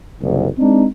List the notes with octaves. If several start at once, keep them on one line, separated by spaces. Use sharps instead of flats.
F#1 C2
G#3 C4 D4 D#4